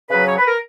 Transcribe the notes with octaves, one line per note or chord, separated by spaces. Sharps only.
C#3 F#3 B4
C#5
B4
A#4